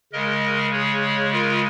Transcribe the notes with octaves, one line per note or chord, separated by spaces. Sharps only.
C#3 G#3 A#4 D#5
G#4 C#5
F4 A#4